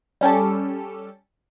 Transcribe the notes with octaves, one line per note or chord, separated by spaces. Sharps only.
G3 C#4 G4 A4